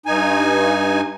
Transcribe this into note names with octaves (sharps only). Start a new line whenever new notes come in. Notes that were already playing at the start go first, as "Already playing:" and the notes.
G2 D#4 G#5